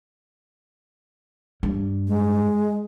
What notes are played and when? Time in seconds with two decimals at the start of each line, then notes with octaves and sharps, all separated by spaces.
1.63 G2
2.08 G#3